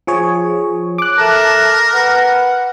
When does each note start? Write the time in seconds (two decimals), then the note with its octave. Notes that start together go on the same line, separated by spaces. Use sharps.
0.07 F3 G#4 C#5
0.98 D6 F#6
1.18 A4 A#4 E5 A5
1.93 B4 F#5